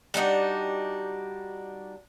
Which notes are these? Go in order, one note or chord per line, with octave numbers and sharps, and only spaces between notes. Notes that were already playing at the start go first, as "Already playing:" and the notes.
G3 D4 D#4 F#4